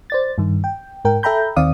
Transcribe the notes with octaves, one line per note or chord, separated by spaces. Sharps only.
C5 D5 A6
G2 D#3
G5
G#2 A#4 G5
A4 E5 G5 A#5 B5 G6
D#2 D#3 C4 D5 F5 D#6